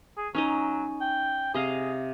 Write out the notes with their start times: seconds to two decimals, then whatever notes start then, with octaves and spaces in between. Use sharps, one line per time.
0.17 G#4
0.35 F#3 C#4 D#4 D#5
1.01 G5
1.54 C3 G#4 D#5 F5